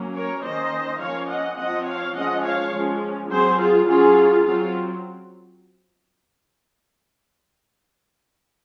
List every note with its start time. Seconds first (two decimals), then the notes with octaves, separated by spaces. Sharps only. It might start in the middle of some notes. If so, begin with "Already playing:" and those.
Already playing: F#3 A#3 C#4
0.15 A#4 C#5
0.44 D#3 A#3 C#4 C5 D#5
1.01 F3 A#3 C#4 C#5 F5
1.29 D#5 F#5
1.58 F3 C4 D#5 F#5
1.87 C#5 F5
2.15 F3 G#3 C#4 D#5 F#5
2.45 C#5 F5
2.73 F3 G#3 C#4
3.30 F#3 C4 G#4 C5
3.59 F4 G#4
3.87 F#3 C#4 F4 G#4
4.45 F#3 C4 F4